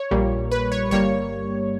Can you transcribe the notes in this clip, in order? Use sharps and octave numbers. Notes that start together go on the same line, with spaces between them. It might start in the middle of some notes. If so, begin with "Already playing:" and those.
Already playing: C#5
A#1 A#2 G3 A#3
B4
C#5
G1 G2 G3 A#3 C#5